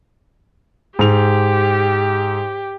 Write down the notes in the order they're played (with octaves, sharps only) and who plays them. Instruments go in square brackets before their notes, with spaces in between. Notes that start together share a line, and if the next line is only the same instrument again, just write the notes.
[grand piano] G#2 F7 [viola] G4